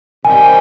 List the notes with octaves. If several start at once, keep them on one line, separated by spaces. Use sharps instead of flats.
C3 D#3 G3 C4 G#5